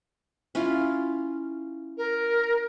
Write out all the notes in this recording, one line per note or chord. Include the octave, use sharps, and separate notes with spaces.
C#4 E4 F4
A#4